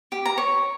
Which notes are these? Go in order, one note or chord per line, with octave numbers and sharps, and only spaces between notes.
G4
A#5
C#5